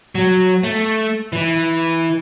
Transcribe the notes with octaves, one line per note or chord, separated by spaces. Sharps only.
F#3
A3
E3